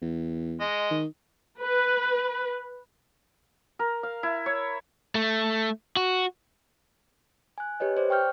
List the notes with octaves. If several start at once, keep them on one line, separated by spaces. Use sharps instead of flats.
E2
G#3 D#5
D#3
B4
A#4
F5
E4
C#5
A3
F#4
G#5 F#6
G4 B4 C#5 D#5
C5 D5
G5 C#6 F6 G6